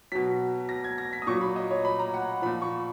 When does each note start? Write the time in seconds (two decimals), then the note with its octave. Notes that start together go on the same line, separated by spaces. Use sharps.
0.12 B2 F#3 B6
0.69 A#6
0.84 G#6
0.98 A#6
1.13 B6
1.22 D#6
1.27 A#2 F#3 C#6
1.41 B5
1.56 D#5
1.71 C#5
1.85 B5
1.99 A#5
2.14 F#5
2.42 A#2 F3 B5
2.62 C#6